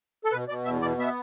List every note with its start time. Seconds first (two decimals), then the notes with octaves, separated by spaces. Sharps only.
0.24 A4
0.32 B2 B4
0.49 B2 D5
0.65 E2 E5
0.82 B2 D5
0.99 B3 E5